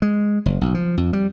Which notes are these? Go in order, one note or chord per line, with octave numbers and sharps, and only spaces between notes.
G#3
F#1
B1
F3
F2
G3